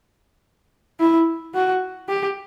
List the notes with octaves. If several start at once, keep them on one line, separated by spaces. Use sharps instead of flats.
E4
F#4
G4